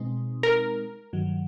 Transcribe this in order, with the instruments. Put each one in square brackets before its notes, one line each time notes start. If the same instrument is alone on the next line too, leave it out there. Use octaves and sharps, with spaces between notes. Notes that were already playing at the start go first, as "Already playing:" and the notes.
Already playing: [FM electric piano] B2 G#3 C4 D#4
[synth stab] A#4
[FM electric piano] G2 D#3 F#3